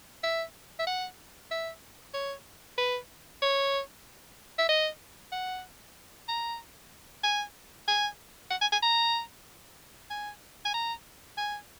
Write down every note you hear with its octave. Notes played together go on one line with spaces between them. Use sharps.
E5
E5
F#5
E5
C#5
B4
C#5
E5
D#5
F#5
A#5
G#5
G#5
F#5
G#5
G#5
A#5
G#5
G#5
A#5
G#5